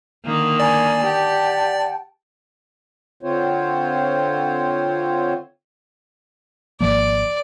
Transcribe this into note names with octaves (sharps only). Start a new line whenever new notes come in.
D3 D#3 A#3
D5 G#5 A#5
G4 F#5 G5 A5
D3 C4 F4 C5 C#5
G#1 F3 A#3 D5